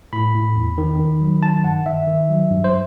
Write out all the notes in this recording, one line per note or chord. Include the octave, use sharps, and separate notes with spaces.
A2 B5
A2
E2
D#3
D#3
F#3
D#3 A5
G2 F#5
D#3 E5
D#3
F#3
G2
C5